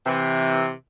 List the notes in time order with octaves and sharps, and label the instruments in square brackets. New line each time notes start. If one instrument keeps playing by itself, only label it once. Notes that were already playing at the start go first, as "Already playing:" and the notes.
[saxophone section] C3 E3